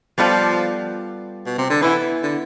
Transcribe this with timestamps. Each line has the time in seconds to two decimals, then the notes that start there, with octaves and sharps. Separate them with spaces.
0.18 F3 G3 B3 F4 A4 D5
1.46 B2
1.58 C3
1.70 D3
1.82 E3 B3 E4 B4
2.23 D3